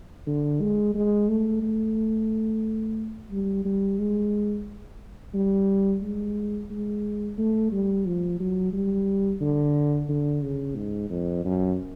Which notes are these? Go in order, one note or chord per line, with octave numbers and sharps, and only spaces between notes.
D3
G#3
G#3
A3
A3
G3
G3
G#3
G3
G#3
G#3
A3
G3
F3
F#3
G3
D3
D3
C#3
G#2
F2
F#2